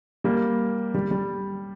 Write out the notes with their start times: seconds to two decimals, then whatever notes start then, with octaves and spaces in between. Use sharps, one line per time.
0.24 G3 A#3
0.94 G3
1.11 G3